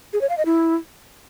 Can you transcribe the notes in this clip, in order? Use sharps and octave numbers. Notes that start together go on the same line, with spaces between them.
G#4
C#5
F5
D#5
E4